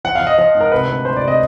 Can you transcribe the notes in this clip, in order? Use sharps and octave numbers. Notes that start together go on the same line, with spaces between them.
F3 F#5
F5
F3
D#5
F3 D#5
G#2
A#4
C3 B4
D2
D2 C5
D5
C3
D#5